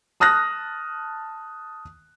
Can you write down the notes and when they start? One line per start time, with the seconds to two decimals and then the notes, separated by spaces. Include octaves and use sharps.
0.20 A5 D#6 F6 F#6 A#6